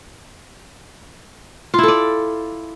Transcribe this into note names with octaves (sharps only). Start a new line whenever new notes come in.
E4 F4 A4 D5